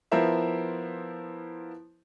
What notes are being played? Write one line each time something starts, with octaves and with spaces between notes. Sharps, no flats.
F3 B3 E4 A#4 C5 E5